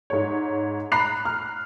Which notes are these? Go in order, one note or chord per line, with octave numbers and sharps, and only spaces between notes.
G#2 C#5
A#5 B5 F#6 C7 F7
F6